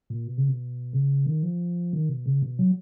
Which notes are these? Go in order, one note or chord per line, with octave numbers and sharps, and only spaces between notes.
A#2
B2
C#3
B2
C#3
D#3
F3
D#3
B2
C#3
B2
F#3